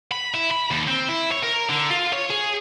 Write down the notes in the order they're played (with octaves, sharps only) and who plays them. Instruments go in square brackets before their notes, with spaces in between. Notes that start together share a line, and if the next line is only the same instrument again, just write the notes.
[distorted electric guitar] B5
E4
B5
D#2
C4
E4
C#5
A#4
D3
F4
C#5
G#4